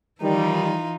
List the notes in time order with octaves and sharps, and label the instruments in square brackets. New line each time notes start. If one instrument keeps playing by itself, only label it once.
[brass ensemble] D#3 G3 [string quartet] E3 D#4 F4